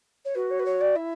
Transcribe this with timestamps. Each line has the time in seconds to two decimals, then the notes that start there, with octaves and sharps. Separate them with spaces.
0.25 C#5
0.35 F#4 B4
0.50 C#5
0.59 B4
0.65 C#5
0.80 D5
0.96 E4 E5